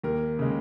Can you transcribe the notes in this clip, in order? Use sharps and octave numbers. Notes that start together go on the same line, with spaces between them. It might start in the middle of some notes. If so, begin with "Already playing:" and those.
D#2 A#4
C#3 G#3